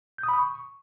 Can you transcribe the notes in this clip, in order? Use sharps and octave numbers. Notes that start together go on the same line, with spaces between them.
G6
D#6
B5
D#6
C#6